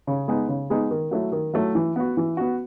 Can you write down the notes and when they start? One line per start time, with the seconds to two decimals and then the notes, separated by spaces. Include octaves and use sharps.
0.07 C#3
0.28 G#3 B3 D#4 G#4
0.49 C#3
0.70 G#3 B3 D#4 G#4
0.91 D#3
1.11 F#3 A3 E4
1.32 D#3
1.54 F#3 A3 E4
1.75 E3
1.96 B3 F#4
2.17 E3
2.37 B3 F#4